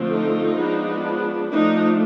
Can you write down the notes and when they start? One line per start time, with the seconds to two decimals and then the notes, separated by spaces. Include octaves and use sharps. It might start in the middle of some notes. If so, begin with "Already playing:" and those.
Already playing: D3 F3 A3 C4
0.11 D#4 F4
0.58 F3 G#3 B3 D4
1.51 F3 A3 D4 D#4